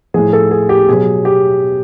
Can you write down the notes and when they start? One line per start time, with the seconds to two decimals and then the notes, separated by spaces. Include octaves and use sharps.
0.14 A2 F3 G#4
0.33 A4
0.51 G#4
0.69 G4
0.88 B2 F#3 G#4
1.25 G4